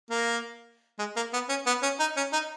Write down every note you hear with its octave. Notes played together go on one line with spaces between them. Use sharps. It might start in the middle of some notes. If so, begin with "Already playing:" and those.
A#3
G#3
A#3
B3
C#4
B3
C#4
D#4
C#4
D#4